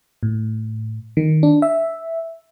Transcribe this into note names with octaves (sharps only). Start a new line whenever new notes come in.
A2
D#3
D4
E5